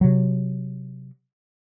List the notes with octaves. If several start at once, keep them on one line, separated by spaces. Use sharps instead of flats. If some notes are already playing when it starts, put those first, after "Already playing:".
C3 F#3